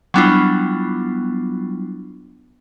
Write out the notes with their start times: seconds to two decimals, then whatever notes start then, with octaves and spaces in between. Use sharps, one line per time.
0.14 F#3 G3 B3 D4 E4 F4